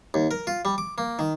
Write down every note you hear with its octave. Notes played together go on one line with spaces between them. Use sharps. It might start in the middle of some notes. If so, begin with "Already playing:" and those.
D#2
A#4
F4
G3
D6
A#3
D#3